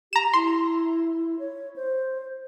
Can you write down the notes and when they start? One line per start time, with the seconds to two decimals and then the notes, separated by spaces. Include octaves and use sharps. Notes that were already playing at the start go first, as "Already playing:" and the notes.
0.13 G4 A#5 E7
0.33 E4 C6
1.39 C#5
1.76 C5